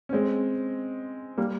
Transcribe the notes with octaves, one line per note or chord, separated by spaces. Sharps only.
C#4
G#3 C4
G3 A#3